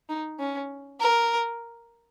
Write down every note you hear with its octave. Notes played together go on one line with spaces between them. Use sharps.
D#4
C#4
A#4